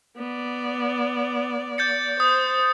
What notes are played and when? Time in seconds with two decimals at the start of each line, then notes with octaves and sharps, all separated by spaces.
0.17 B3 D5
1.78 G6 A6 C#7
2.20 C5 D#6